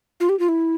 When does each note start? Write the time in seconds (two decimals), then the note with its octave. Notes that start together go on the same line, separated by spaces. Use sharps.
0.20 F4
0.29 G4
0.39 F4
0.49 E4